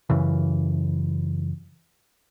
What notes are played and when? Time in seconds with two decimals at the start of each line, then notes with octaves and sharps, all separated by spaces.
0.10 F#2 C#3 E3